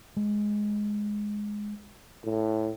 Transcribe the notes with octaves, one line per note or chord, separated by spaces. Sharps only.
G#3
A2